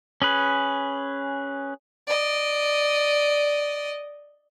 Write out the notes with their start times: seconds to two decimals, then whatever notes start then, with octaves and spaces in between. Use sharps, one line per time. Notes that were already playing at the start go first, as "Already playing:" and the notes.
0.22 C#4 G#4 B4
2.07 D5 D#5